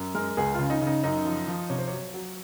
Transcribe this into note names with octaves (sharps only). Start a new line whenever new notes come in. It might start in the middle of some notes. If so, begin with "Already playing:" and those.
Already playing: F#2
G#3 A#4
C#2 G#4
C#3 F4
D#4
C#3
D#4
F#2 D#4
F3
F3
C3 C#5
C5
F#3 C#5
F#3